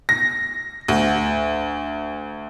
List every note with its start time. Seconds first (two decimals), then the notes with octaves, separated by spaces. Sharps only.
0.09 A#6
0.88 D2